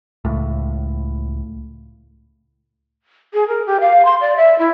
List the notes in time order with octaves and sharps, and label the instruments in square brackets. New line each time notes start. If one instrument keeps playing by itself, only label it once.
[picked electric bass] C#2 A2
[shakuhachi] G#4
A#4
G4
F5
C6
D5
E5
E4